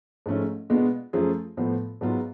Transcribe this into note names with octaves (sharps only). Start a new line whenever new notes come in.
G#2 F3 A3 C#4
B2 G#3 B3 D4 F4
F#2 F3 A3 F4 G#4
A2 F3 B3
G#2 F#3 B3 F4